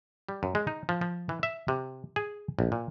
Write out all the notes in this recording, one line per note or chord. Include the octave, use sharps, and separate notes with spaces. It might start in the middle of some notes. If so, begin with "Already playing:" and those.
G3
F#2
G#3
D#4
F3
F3
E3
E5
C3
G#4
A#1
A#2